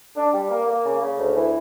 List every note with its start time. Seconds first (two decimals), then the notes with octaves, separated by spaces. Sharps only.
0.17 D4
0.33 G3
0.50 A#3
0.67 A#3
0.85 C#3
1.01 C#3
1.18 D2
1.35 E3